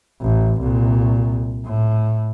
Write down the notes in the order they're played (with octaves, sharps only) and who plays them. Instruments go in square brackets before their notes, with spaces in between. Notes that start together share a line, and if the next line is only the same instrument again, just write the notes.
[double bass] A1
C2 A#2
A2